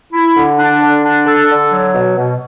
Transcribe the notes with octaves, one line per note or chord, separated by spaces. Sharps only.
E4
D3
D4
D3
D4
A4
D3
F#3
B2
B2